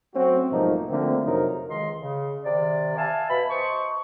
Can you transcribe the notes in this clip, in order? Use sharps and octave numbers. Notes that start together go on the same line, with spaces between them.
F#3 A3 C4 C#4 F#4
B1 G#2 F3 A3 A#3 D#4
D3 F3 A3 A#3 C4
F2 C3 F3 F#3 D#4 A#4
C#2 D#3 G#3 D#5 C6
C#3
C3 D#3 D5
E5 F5 G#5 A5
B2 B4 B5
C5 D#5 A5 C#6